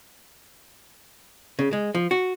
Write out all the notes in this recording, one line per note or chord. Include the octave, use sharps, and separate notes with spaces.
C#3
G#3
F3
F#4